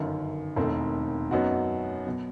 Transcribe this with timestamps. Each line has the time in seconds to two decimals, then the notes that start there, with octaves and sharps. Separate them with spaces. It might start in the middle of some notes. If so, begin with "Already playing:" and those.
Already playing: G1 F#2 D#3
0.56 E1 D#2 D#3 A3 C4
1.31 F#2 F#3 B3 D#4 F#4
2.07 B2 F#3